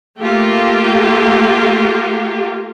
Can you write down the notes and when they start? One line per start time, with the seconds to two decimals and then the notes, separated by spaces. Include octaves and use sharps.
0.19 A3 A#3 F4 G4